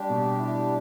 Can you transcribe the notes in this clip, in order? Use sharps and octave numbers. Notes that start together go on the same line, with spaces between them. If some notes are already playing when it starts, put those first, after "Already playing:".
Already playing: G3 D4 G4
B2
E4